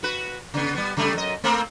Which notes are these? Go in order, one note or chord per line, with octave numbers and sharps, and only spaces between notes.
F#4 B4
C#3 B3
G3 B3
C#3 G3 A3
F#2 D#5
A3 A#3 C4